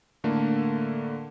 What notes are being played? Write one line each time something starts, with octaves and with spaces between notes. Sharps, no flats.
A2 D3 A3 A#3